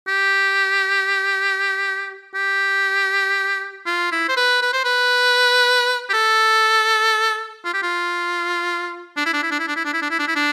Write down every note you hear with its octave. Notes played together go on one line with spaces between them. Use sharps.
G4
G4
F4
E4
C5
B4
B4
C5
B4
G4
A4
F4
G4
F4
D4
E4
D4
E4
D4
E4
D4
E4
D4
E4
D4
E4
D4
E4
D4